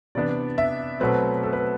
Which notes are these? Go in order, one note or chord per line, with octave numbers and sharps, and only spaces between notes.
C3 E3 B3 D4 D5
E5
B2 F#3 A3 C4 B4
A4
B4